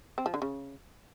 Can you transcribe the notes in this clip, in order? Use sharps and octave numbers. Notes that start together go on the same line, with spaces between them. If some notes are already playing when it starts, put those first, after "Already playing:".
C4
F3
D3
C#3